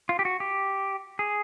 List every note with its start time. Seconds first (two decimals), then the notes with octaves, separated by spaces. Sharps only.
0.09 F4
0.19 G4
0.25 F#4
0.40 G4
1.19 G#4